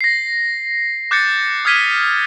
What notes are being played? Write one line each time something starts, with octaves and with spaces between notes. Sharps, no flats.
A#6 C7
D6 F#6 G6 A6 A#6 C#7
D#6 F6 G#6 B6 D#7 G7